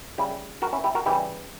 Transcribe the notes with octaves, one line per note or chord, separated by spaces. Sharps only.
C#3 G3 E4 G4
F#4 A#4
C#4 E4
E4 G4
F#4 A#4
C#3 E3 G3 E4 G4